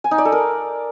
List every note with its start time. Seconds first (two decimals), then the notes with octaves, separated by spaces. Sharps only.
0.04 G#5
0.11 D#4
0.18 D5
0.25 A4
0.32 A#4